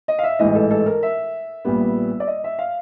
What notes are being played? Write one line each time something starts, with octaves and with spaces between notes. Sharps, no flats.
D#5
F5
E5
A1 G#2 E3 D#5
A4
A4
A#4
E5
A#1 A#2 G3 B3
D5
D#5
E5
F5